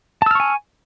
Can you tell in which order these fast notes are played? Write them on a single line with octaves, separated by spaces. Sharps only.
A5 E6 F6 C#6 G#5